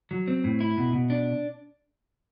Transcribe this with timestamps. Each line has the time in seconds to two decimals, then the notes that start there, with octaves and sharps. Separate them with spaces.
0.11 F#3
0.28 C4
0.44 A2
0.60 E4
0.77 B2
0.93 B2
1.10 D4